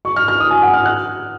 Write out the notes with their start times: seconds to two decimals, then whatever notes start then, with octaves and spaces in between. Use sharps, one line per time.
0.05 C#6
0.16 F6
0.28 F6
0.40 D#6
0.51 G#5
0.62 F#5
0.74 F6
0.85 F#6